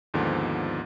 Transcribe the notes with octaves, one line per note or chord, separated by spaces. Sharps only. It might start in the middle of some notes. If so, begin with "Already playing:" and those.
D#2 G#2 D3 F3 B3